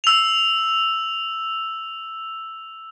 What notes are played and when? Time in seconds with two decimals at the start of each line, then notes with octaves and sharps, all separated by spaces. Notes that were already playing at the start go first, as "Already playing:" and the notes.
0.04 E6 F7